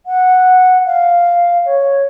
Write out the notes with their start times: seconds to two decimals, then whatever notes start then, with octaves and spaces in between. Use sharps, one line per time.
0.06 F#5
0.86 F5
1.66 C#5